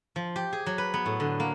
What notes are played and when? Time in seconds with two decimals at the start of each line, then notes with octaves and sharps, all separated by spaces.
0.16 F3
0.36 G4
0.53 G#4
0.66 F#3
0.78 B4
0.94 B3
1.06 A2
1.20 D3
1.40 A#3